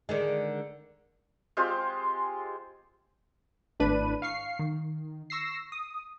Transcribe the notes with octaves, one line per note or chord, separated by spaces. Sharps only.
D3 D#3 G#3
G#3 C4 F4 G4
G#1 A2 D4 B4 D#7
F5 C#6 C7
D#3
C#6 E6 A#6 C7
D#6